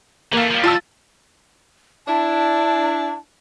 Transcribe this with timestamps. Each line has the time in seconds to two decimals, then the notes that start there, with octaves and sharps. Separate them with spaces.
0.33 E3 A3 A#3 F5
0.50 F3 G3
0.64 F4 A5 E6
2.07 D4 E4 A5